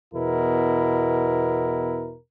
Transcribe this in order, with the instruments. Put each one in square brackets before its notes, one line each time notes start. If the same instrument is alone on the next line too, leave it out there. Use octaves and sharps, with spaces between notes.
[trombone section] E2 B2 E4 A#4